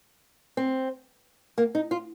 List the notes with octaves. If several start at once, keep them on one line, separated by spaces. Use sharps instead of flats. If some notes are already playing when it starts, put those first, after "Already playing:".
C4
A#3
D#4
F4